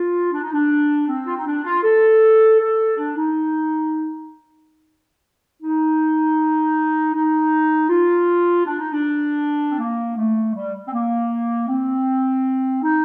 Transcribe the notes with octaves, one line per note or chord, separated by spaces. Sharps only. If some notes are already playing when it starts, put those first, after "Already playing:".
Already playing: F4
D4
D#4
D4
C4
F4
D#4
D4
F4
A4
A4
D4
D#4
D#4
D#4
F4
D4
D#4
D4
C4
A#3
A3
G3
C4
A#3
C4
D#4